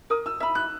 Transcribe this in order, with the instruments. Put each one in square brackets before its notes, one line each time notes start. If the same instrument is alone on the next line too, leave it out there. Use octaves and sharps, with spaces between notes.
[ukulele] A#4 [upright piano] D#6
[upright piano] E6
[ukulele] E5 B5 [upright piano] E6
[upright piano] F#6